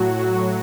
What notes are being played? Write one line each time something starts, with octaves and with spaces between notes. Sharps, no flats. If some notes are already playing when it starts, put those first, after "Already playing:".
Already playing: A2 F#3 F#4